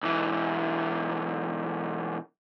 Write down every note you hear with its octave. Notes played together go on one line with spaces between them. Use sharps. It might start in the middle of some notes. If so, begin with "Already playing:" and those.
B1 E3